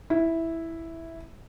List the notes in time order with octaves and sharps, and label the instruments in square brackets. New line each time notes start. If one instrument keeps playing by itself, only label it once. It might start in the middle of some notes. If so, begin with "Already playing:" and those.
[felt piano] E4